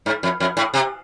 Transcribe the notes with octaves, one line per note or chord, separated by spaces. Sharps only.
G#2
F2
F2
A2
C3